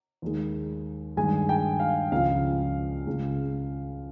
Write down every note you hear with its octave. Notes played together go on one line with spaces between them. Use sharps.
D#2 D#3 G#3
G2 D#3 G#3 G#5
G5
F5
C#2 C#3 F3 F5
C#2 C#3 G#3